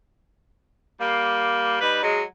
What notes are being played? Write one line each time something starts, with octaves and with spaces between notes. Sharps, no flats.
G3 A#3
G3 D#4 B4
F#3 G#3